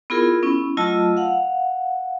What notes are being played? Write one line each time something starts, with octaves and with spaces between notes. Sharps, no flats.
B3 E4 F4 G#4 A#4
B3 C#4 E4
F#3 A3 F4 D#5 A5 E6
F5 F#5